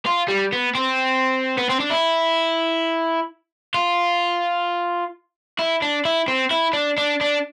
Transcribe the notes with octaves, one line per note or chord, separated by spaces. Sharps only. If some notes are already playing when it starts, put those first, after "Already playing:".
F4
G3
B3
C4
B3
C4
D4
E4
F4
E4
D4
E4
C4
E4
D4
D4
D4